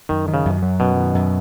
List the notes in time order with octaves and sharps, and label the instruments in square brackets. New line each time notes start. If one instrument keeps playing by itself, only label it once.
[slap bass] F#2 [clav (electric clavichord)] D#3
[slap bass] D#3
[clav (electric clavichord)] C#3
[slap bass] F#2
F#3
[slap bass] F#2 [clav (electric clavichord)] B2
[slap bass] D#3
F#2